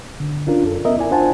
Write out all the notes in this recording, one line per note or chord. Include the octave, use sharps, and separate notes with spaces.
D3
C#4 D4 F4 A#4
F#2 A4
B3 C#4 A#4 D#5 E5
E4 D5 G#5
D4 F4 C5 F#5 G#5 A5